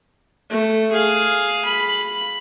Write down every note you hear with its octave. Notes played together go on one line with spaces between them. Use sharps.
A3
G#4 F5
B5